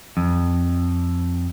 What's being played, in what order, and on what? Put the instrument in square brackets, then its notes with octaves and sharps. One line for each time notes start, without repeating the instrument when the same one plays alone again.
[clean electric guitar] F2